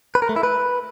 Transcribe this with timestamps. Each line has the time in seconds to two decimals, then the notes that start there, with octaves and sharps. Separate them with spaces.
0.15 B4
0.22 A#4
0.29 A3
0.36 E4
0.43 B4